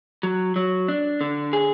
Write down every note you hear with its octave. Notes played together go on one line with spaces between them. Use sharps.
F#3
F#3
D4
D3
G#4